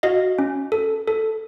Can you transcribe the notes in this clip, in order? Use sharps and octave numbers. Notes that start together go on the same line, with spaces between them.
F#4 D#5 F5
C#4
A4
A4